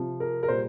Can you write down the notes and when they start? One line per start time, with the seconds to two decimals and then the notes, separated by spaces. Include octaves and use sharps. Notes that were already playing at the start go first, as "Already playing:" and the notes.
Already playing: C3 F3
0.20 A#4
0.43 A#4
0.48 A#2 G3 C5